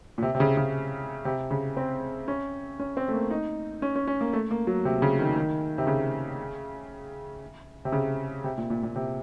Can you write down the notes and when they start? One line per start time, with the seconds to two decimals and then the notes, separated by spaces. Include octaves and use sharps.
0.18 A#2
0.22 C3
0.35 C3
0.40 C#3
0.57 C#3
1.25 C3
1.51 C#3
1.77 C4
2.28 C#4
2.80 C#4
2.97 C4
3.08 A3
3.14 A#3
3.31 D#4
3.82 C#4
3.96 C#4
4.07 C#4
4.21 A#3
4.33 A3
4.51 A#3
4.67 F#3
4.85 C3
5.02 C#3
5.19 D#3
5.36 D#3
5.78 C3
5.87 C#3
7.85 C3
7.92 C#3
8.44 C3
8.58 A#2
8.70 A#2
8.83 A#2
8.96 C3